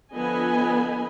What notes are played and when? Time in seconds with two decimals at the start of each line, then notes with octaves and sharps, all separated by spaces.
0.15 D3 F3 B3 D#5 G#5 B5